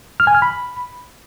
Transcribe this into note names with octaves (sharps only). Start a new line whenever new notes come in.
F6
G#5
F6
B5